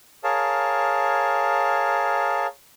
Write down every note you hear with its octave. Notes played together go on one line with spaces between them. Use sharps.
G#4 A#4 C#5 F5 A5